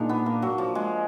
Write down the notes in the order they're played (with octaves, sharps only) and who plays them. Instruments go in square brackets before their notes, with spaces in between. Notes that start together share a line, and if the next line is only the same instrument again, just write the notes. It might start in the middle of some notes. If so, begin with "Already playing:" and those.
Already playing: [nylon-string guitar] A#2 G#3 D#4 [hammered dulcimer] D4
[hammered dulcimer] B3
A#3
F#3
F3
G#3